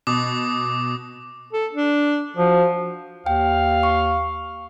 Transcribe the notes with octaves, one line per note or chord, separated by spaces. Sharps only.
B2 D6 D#6
A4
D4
F3 F#4
D#2 F5 G5
C#6